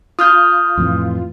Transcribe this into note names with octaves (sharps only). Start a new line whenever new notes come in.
F4 D#6 F6 G6
F2 A2 E3